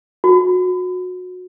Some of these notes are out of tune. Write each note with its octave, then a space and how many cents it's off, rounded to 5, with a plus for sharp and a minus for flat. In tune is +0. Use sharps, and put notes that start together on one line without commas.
F#4 -25